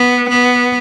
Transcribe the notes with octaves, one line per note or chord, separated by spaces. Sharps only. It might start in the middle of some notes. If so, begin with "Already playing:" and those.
Already playing: B3
B3